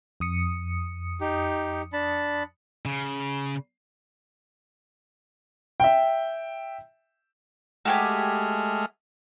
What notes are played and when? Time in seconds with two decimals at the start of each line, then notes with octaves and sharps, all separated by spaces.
0.20 F2 D#6 C#7
1.21 D#4 G4
1.93 D4 A5 B5
2.86 C#3
5.80 E5 G5
7.85 G#3 A3 F#4 G4 G#5 F6